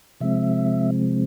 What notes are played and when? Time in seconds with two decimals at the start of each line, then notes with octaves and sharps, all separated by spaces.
0.21 C3 F3 G#3 C4 E5